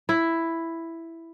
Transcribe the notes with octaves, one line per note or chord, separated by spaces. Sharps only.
E4